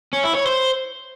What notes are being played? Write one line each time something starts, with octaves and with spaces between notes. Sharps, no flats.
C#4
E4
C#5
C5